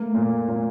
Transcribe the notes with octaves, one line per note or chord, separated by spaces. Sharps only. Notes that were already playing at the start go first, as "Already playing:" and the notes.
Already playing: A3 A#3
A#2
A#2